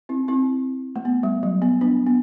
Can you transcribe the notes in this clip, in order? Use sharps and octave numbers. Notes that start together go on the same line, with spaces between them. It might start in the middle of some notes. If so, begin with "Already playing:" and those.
C4 E4
C4 E4
A3
B3
G3
F#3
B3
B3 D4
B3